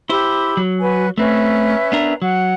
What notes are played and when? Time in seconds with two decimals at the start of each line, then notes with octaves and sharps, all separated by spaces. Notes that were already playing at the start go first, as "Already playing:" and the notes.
0.10 E4 G4 C5 B5 E6
0.57 F#3
0.81 F#4 B4 G#5
1.18 A3 C4 C#4 B4 E5
1.92 B3 D4 A#4
2.22 F#3 F#5